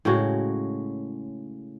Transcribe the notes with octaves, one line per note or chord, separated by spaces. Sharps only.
A2 C#3 G#3 F#4